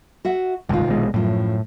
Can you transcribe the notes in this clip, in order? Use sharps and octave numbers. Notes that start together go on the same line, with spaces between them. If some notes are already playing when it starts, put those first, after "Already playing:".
F#4 E5 F#5
F#1 C2 G#2 D#3 F4
A#1 B2 G#3
F#2 A2 F3